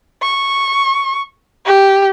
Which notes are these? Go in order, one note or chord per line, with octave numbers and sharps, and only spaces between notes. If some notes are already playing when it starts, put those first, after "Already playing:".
C#6
G4